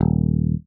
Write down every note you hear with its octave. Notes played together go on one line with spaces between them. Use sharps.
D#1